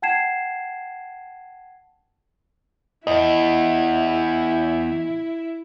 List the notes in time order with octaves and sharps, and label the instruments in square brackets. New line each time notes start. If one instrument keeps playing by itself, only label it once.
[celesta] F#5 G5 A5 G#6 C7 E7
[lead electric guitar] E2 [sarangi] E4 [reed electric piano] D#5